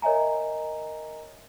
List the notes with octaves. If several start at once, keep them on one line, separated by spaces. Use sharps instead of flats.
A#4 C#5 D#5 E5 G#5 A#5